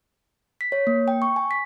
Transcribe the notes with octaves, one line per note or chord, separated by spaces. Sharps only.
B6
C#5
A#3
G5
C#6
G#5
B6